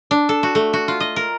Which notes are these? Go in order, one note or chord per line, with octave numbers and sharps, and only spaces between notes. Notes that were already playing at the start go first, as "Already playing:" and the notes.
D4
A4
F#4
A3
F#4
F4
D#5
A#4